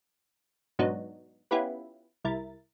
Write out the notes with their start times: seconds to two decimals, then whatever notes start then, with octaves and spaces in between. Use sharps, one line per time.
0.79 G#2 B2 F#3 B3 D4 D#4
1.51 B3 C#4 E4 F4 G4 B4
2.24 C2 E4 A#4 A6